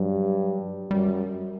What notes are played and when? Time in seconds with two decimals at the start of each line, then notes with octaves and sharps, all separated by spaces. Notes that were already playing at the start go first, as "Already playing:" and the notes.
Already playing: G2 F#3
0.90 F#2 G3